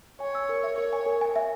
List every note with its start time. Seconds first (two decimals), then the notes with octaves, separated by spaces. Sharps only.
0.20 C#5 G#5
0.35 E6
0.49 A#4
0.63 E5
0.78 A#4 C#5
0.93 G#5
1.06 A#4
1.21 G#5
1.36 E5